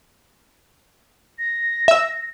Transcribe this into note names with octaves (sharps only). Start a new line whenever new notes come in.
A#6
E5 E6